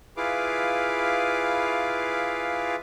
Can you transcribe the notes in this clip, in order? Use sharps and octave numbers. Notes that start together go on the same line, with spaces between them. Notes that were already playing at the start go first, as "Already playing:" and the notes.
E4 F4 G#4 B4 F5 D6